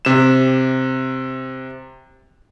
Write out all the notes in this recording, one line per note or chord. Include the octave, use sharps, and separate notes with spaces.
C3 E7